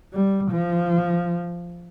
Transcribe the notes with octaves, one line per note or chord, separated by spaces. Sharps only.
G3
F3